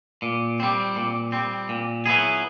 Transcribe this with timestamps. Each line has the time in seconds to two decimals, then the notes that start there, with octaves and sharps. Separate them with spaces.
0.22 A#2
0.60 G3 C4
0.96 A#2
1.32 G3 C4
1.69 A#2
2.06 F#3 B3 E4 G#4